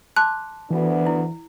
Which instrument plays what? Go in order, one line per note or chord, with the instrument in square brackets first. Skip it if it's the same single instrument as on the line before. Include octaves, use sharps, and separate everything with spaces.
[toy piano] A5 C6 D6 [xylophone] F#6
[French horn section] D2 B3 D4 [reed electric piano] E3
[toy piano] E4